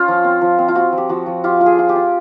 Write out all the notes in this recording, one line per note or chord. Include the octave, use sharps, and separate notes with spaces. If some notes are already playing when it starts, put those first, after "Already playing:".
Already playing: C#4 F4
F3
C4
F3
C4
F4
C4 F#4
F3
G4
F3 F#4
F3
F4 G4
F4
G#4
F4
G4
F4